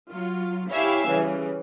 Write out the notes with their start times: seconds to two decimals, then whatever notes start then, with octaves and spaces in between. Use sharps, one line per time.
0.11 F#3 F4
0.71 E4 G4 C#5 E5 F5 G#5
1.09 C#3 E3 G3